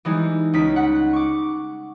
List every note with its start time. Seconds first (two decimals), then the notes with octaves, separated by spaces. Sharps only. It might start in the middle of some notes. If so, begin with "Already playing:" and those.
0.05 E3 G3 G#3 D#4
0.53 C#2 D#4 B6 D7
0.76 F#5
1.13 C#6 D6